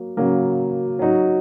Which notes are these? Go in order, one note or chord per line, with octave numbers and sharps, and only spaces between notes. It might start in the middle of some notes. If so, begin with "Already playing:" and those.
Already playing: F#3 A#3
C#3 F#3 A#3
F#3 D#4 F#4